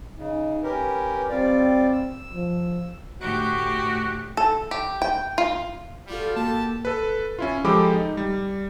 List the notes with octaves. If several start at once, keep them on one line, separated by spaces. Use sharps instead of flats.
C#3 D#4
C#4 G4 A#4 B4
G3 C4 F4 D5
E6
F3
D2 A2 F#4 G4
A4
G4
G5
F4
G3 F4 F#4 A4
A#3 G4 A4 A5
A4 B4
C#4 E4 F4
F3 G#3 G4 A4 B5 D6
D#4
G3